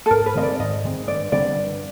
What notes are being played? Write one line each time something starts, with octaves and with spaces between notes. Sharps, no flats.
A4
G#2 A#4
B4
D#3 G#3 C4 D#5
D5
G#2 D#5
D#3 G#3 C4
G2 D5
D3 G3 C4 D5
G2